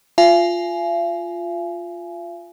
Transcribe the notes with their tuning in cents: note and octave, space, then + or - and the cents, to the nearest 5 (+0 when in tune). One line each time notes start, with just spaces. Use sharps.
F4 +0 F5 -45 G#5 +20